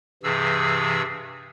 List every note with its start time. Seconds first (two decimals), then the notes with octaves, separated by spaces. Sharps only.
0.23 G2 C3 E3 G#4 E6